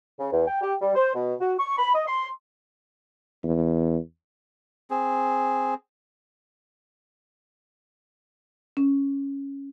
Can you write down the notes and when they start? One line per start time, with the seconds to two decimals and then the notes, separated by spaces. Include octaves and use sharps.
0.20 C#3
0.31 E2
0.47 G5
0.61 G4
0.81 G3
0.96 C5
1.15 B2
1.40 F#4
1.58 C#6
1.78 B5
1.94 D#5
2.07 C6
3.44 E2
4.90 C4 G#4
8.77 C#4